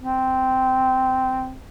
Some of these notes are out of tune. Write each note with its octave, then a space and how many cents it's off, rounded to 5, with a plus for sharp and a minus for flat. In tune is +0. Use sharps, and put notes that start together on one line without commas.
C4 -10